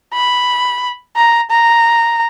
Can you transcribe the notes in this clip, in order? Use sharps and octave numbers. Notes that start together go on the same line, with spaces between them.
B5
A#5
A#5